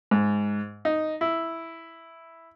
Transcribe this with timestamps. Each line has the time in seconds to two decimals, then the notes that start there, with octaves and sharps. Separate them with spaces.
0.11 G#2
0.85 D#4
1.21 E4